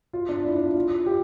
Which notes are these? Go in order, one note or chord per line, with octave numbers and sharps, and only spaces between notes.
F4
D4
E4
D4
F4
F4
G4